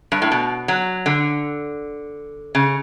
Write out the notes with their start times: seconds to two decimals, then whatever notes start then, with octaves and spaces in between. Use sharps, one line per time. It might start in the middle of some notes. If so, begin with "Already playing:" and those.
0.12 G2
0.22 A2
0.32 B2
0.68 F#3
1.06 D3
2.55 C#3